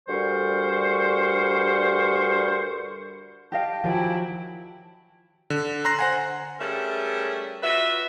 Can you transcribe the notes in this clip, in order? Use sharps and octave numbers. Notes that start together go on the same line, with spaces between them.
D2 G2 G3 A#4 C5 C#6
G4 D#5 F5 G5 A5
D#3 F3 F#3 E4 G4 G#5
D3
A#5 C6 F#6 A#6 C7
C5 F#5 G#5
G3 A3 C#4 G#4 A#4 E5
F4 F#4 B4 E5